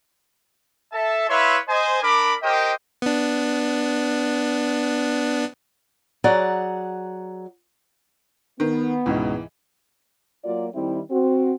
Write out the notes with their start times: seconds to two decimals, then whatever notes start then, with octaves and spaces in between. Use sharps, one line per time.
0.92 A4 E5 A5
1.28 E4 B4 C#5 E5 F5 C6
1.68 C5 D#5 G#5
2.02 D4 A#4 B5 D6
2.42 G4 A#4 C5 D#5 G5
3.02 B3 D4
6.24 F#3 G#4 D5 F#5 A#5
8.60 D#3 B3
9.06 C#2 G#2 B2 E3
10.45 F#3 A#3 F4 F#4 D5
10.74 D#3 G3 C4 E4
11.11 C4 F#4